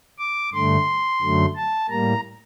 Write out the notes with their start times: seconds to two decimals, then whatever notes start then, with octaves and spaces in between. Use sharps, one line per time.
0.19 D6
0.54 G2 D3 A3 C6
1.22 F#2 D3 F#3 A3
1.56 A5
1.89 A2 G3 A#3 A#5